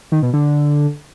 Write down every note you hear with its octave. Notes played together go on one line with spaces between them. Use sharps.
D#3
B2
D3